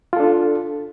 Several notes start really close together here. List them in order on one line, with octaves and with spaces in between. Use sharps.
F4 A4 D4